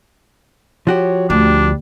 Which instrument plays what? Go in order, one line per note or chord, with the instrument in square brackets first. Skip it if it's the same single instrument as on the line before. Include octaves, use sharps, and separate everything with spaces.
[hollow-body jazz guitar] F3 F#4 G4 [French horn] C#5
[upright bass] D2 [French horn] G3 [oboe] D4